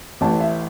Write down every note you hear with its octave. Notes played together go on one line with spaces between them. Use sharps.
A1 A2 E3 A5
E5